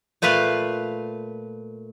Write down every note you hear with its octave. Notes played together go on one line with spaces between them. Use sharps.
A#2 A3 F4 B4 F5